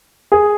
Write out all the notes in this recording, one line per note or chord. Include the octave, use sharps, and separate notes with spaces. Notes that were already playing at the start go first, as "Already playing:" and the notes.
G#4